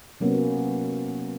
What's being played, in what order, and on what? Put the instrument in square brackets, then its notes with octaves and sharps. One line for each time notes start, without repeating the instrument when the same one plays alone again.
[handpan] C3 F#3 A#3 B3 C#4